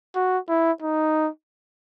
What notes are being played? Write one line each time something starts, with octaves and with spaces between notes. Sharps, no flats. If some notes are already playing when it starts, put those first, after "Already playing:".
F#4
E4
D#4